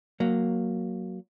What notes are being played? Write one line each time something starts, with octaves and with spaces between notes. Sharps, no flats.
F#3 A#3